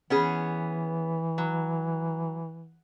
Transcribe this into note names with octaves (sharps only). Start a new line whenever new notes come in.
E3 B3 C#4 G#4
F#3